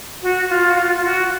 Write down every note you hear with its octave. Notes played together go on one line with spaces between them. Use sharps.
F#4
F4
F#4
F4
F4
F#4